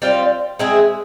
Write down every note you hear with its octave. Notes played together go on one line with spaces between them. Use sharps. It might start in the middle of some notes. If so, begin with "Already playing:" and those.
G3 C4 F4
G#3 C4 E4 G#4